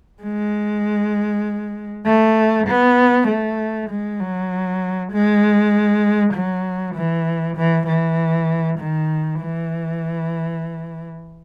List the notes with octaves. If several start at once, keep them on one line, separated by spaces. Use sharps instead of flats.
G#3
A3
B3
A3
G#3
F#3
G#3
F#3
E3
E3
E3
D#3
E3